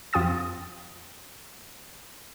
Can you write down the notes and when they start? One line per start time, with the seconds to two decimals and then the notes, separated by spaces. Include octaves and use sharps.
0.13 F2 F4 G5 D#6 A6